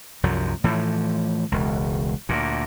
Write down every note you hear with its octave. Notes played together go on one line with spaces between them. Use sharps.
C2 F#2 F3 F#3
A2 E3 F3
E1 C#2
D2 A#2